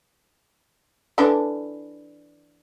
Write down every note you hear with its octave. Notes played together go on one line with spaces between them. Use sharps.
D3 E3 D4